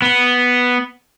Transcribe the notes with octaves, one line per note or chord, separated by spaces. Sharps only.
B3